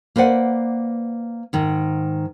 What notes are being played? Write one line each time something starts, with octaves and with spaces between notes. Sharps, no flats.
A#3 B4 C5 D5 F#5
G#2 D#3